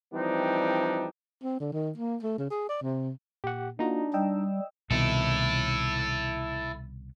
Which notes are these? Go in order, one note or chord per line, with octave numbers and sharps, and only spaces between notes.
E3 F3 G3 C4 D4 D#4
C4
D3
D#3
A#3
A3
C#3
G#4
D5
C3
A#2 G4 F#5
A#3 D4 D#4 F4 F#4 A#5
G3 D#5 G5 E6
C2 B2 D#3 E4 A4